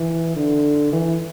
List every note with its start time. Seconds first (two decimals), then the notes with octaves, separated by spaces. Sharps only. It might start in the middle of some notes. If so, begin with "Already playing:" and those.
Already playing: E3
0.36 D3
0.93 E3